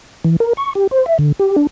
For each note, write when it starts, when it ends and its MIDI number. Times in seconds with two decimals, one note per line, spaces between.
0.24 0.37 52
0.40 0.53 70
0.57 0.73 85
0.75 0.87 67
0.91 1.06 72
1.06 1.18 76
1.19 1.32 50
1.40 1.56 67
1.56 1.67 62